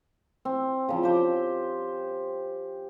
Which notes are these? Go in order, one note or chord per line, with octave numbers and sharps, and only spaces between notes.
C4
C#3 F3
G4 C5 G5